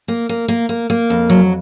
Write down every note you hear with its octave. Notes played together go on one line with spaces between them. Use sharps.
A#3
A#3
A#3
A#3
A#3
F2
F#3